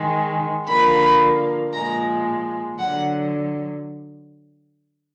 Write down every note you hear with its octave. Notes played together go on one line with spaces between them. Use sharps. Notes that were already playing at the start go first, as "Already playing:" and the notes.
Already playing: D#3 G#3
D3 F3 A#3 B5
A#2 F3 G#3 A#5
D3 F#3 F#5